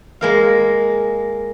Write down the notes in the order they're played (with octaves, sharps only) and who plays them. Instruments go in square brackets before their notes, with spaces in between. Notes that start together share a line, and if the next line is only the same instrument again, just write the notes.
[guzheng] G#3 A#3 F5